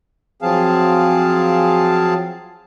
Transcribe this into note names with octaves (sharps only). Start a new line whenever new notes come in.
F3 F#3 C4 G#4 F5 A5